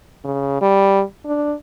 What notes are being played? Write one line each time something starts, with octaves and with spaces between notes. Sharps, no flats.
C#3
G3
D4